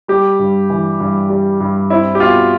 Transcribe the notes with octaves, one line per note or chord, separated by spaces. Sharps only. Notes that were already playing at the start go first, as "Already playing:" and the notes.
G3 G4
G2
E3
G2
G3
G2
C4 E4
G4
B2 F4